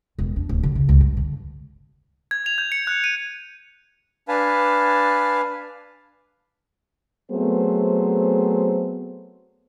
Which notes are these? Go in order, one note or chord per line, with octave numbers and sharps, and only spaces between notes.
E1
D4
D1
D3
C#3
C#2
G2
D3
G#6
F7
G6
C#7
F#6
D#7
D4 B4 F5 G#5 A5
F#3 A3 B3 C4 G#4 C5